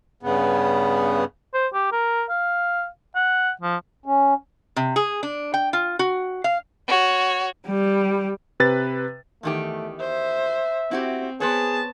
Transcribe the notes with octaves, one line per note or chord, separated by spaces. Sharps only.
G2 C#3 B3
C5
G4
A#4
F5
F#5
F3
C#4
C3
G#4
D4
G5
F4
F#4
F5
F#4 C#5
G3
C3 B4 A6
E2 D#3 A3 G4
C5 E5
C4 E4 F#4 G4
B3 C4 G#4 B4 C#5 A5